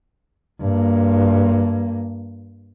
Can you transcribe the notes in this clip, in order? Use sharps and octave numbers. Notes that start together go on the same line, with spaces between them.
G2 A#3